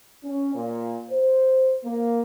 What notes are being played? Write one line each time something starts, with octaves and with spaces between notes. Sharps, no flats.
C#4
A#2
C5
A#3